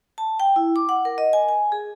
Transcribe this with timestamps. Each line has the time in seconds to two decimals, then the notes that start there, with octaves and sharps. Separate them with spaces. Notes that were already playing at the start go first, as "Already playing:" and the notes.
0.18 A5
0.40 G5
0.56 E4
0.76 D6
0.89 F#5
1.05 A#4
1.18 D#5
1.33 G#5
1.49 G#5
1.72 G#4